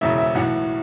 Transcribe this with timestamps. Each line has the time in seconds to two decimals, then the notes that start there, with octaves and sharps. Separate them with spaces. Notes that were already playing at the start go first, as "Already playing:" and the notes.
0.01 E1 E2 C#3 E3 E5
0.18 E5
0.35 B1 A2 E3 F#5